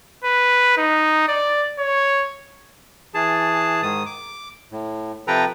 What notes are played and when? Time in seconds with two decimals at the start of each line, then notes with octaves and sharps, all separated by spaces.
0.24 B4
0.77 D#4
1.28 D5
1.79 C#5
3.14 E3 G#4 A5
3.83 G#2 D#3 D#6
4.06 D6
4.71 A2
5.27 C3 F3 A4 B4 G5 A#5